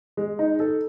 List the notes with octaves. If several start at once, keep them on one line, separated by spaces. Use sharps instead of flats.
G#3
D#4
A4